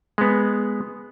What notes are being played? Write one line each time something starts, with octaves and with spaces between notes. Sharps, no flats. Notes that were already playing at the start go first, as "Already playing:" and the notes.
G#3 B3